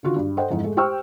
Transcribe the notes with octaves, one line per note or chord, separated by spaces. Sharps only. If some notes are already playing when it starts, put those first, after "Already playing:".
D3 D#3 F4 F#4
G2
A4 C5 D#5 F#5 G5
F2 G#2 E3
G#3 A3
G4 C5 G5 C#6 E6 F6